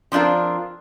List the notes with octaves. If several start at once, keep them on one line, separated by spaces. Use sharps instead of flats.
F3 C4 D4 F4 A#4